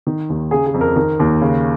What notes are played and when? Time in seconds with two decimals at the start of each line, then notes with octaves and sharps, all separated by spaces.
0.07 D#3
0.29 D#2
0.51 C#3 G#4
0.66 G#4
0.74 F2
0.81 A#4
0.96 D#3 A#4
1.20 D#2
1.41 C#3